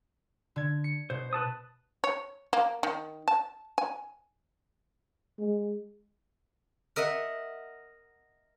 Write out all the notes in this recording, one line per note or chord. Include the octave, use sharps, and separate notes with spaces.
D3 G#6
C#7
B2 C5
B4 A5 D#6
C#5
A#3
D#3
A5
G#5
G#3
A#4 D#5 E5 F#5